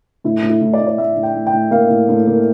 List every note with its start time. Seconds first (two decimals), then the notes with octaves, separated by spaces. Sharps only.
0.24 A2 E4
0.43 A2
0.50 E4
0.61 A2
0.73 D5
0.80 A2
0.87 D5
0.98 A2 E5
1.16 A2
1.23 G5
1.35 A2
1.47 G5
1.53 A2
1.71 A#3 F5
1.90 A2
2.09 A2
2.27 A#3